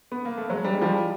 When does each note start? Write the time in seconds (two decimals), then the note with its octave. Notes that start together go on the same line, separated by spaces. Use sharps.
0.12 B3
0.25 A#3
0.37 A3
0.50 F#3 G#3
0.64 G3
0.73 G#3
0.82 F3 G3